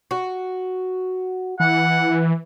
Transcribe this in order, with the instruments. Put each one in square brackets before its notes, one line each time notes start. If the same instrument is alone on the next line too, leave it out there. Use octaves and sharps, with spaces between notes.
[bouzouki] F#4
[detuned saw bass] E3 [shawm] F#5